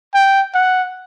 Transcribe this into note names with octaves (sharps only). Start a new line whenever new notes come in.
G5
F#5